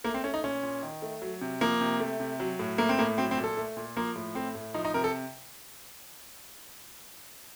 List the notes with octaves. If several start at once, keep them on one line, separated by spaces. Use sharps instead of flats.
A3 A#3
C4
A3 C#4
D#4
A#2 C#4
A#2
D#3
A3
F#3
C3
F3 A#3
C3
A3
C3
F#3
A2
A3 A#3
C4
A2 A#3
F#3 C4
C4
A#2
A4
A3
A#2
F3 A#3
A2
A3 C4
A2
F3 D#4
D#4
C3 A#4
A4